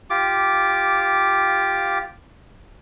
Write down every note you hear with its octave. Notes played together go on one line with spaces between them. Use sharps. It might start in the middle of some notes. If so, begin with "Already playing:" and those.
F4 G4 D6